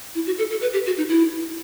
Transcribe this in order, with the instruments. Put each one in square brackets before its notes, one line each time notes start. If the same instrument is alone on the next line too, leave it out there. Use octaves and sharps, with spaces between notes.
[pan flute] E4
F#4
A4
A4
B4
G4
F#4
D#4
E4